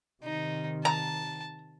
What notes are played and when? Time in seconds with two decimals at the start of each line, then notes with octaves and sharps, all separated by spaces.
0.24 C3 D#3 D#4
0.85 A5 A#5